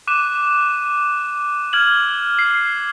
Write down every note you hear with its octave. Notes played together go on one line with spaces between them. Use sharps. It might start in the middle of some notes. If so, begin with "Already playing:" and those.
D6 F#6 D#7 E7
F6 G#6 F#7
C7